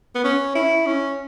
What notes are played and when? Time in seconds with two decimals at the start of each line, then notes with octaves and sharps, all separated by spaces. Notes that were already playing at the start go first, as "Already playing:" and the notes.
0.15 B3
0.24 C#4
0.55 E4
0.86 C#4